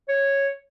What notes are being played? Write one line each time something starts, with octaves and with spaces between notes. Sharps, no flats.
C#5